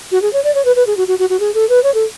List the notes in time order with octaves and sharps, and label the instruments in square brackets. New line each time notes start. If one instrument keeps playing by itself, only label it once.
[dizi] F#4
G#4
C#5
D5
C#5
B4
B4
G#4
F#4
F#4
F#4
F#4
G#4
A4
B4
C#5
A4